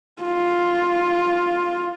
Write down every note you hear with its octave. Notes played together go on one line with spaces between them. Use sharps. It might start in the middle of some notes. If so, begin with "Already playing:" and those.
F4